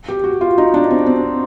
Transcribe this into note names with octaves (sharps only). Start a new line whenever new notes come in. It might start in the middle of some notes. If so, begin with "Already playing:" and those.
G4
F#4
F4
D#4
D4
C4
C4